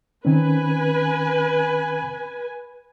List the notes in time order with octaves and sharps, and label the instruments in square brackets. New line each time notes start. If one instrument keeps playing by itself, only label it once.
[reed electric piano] D#3 C4 C#4 [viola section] B4 G#5